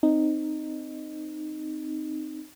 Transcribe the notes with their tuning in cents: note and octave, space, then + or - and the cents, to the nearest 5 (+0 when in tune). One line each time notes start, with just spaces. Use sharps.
C4 -5 D#4 -10